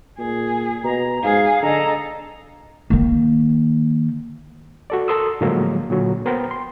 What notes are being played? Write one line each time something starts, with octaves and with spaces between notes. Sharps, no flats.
A#2 G#4
B2 A#5
G#2 G#4 F5
D3 A4 D#5 A#5
D#3 A#3
F#4 A4 D5
A4 A#4 C6 D#6 E6
A2 D3 F3 F#3 G#3 A#3
A#2 D3 F#3
B3 A#4 C5 G5
C6